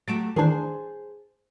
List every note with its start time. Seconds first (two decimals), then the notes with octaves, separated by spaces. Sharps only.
0.08 F#3 A3 G4 A6 D7 E7
0.36 D#3 E3 D4 G#4 C5